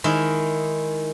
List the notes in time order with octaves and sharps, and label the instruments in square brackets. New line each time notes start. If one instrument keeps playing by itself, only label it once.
[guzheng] D#3 G#3 E4